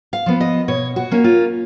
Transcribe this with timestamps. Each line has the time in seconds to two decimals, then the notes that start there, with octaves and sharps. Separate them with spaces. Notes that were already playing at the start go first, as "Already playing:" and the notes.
0.13 F5
0.26 F3 B3
0.41 D#5
0.68 B2 C#5
0.96 F#4
1.11 A#3 C#4
1.24 F4